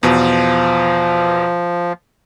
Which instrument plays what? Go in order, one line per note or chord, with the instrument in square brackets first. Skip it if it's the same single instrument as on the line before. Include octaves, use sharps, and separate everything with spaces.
[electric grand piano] E2 B2 [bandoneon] F3